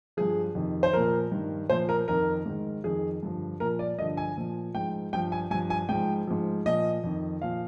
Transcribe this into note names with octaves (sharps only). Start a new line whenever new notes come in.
G2 F3 G#4
F2 C3 D#3
C5
A#2 F3 A#4
G2 D#3
A#2 F3 C5
A#4
F2 D#3 A#4
G#2 D#3
F2 D#3 G#4
G2 D3 F3
A#2 F3 A#4
D5
G2 D3 F3 D#5
G#5
A#2 F3
G#2 F3 G5
G2 F3 G5
G#5
G2 F3 G#5
G#5
G#2 F3 G5
G#2 F3
A#2 F3 D#5
F2 D#3
A#2 F3 F5